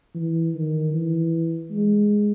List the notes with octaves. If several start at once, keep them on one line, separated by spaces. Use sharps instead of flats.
E3
D#3
E3
G#3